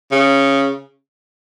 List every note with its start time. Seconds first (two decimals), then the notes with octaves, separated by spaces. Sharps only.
0.12 C#3